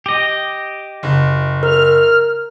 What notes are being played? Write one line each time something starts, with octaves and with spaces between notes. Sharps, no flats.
G4 D#5
F#1
A#4 F6